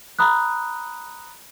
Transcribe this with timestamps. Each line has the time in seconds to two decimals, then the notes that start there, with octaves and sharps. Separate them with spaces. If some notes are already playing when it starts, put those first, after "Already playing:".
0.19 A#5 B5 D#6 F#6